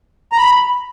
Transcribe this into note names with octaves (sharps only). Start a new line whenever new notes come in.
A#5
B5